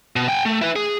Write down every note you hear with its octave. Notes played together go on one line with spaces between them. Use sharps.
B2
G5 G#5
A3
E4 B4
G#4